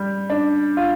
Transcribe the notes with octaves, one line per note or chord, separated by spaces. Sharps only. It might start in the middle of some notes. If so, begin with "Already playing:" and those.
Already playing: G3
D4
F4